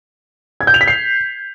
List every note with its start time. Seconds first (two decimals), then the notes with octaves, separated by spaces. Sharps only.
0.61 G#6
0.67 G6
0.74 F7
0.81 B6
0.87 C7